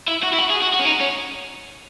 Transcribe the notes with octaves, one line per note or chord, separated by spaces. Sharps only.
E4
F#4
E4
F#4
G#4
F#4
F#4
C#4
D#4
C#4